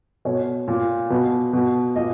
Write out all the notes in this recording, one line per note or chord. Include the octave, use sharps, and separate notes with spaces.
B2 C#5
A#2
B2
B2
A#2 D#5